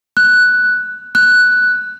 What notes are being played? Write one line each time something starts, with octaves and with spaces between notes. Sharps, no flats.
F#6
F#6